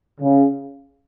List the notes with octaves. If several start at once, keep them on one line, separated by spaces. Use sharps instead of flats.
C#3